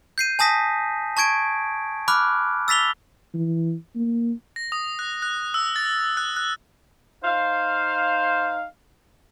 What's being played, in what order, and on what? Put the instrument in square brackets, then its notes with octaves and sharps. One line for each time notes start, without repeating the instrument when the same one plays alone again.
[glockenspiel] G6 C7 D#7
G#5 A5 D#6 A#6 B6
A5 C#6 G#6 D7
B5 D6 F6 F#6
E6 A6 B6 F7 G7
[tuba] E3
A#3
[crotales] A#6
D#6
F#6
F#6
E6
A6
F#6
F#6
[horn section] D#4 F5 [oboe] C5